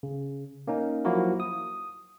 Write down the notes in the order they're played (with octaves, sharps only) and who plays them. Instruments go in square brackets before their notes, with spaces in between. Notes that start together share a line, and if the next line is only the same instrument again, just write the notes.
[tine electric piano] C#3
A#3 C#4 D#4
F3 F#3 A#3 E4 F#4 A#4
D#6